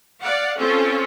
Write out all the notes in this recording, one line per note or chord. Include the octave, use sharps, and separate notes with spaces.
D5 F5 F#5
C4 C#4 F4 A4